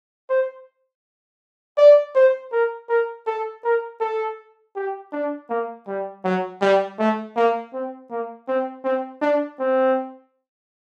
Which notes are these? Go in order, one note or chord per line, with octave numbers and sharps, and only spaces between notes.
C5
D5
C5
A#4
A#4
A4
A#4
A4
G4
D4
A#3
G3
F#3
G3
A3
A#3
C4
A#3
C4
C4
D4
C4